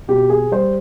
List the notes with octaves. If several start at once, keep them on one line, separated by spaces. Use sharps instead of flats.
B2 G4
G#4
G3 C5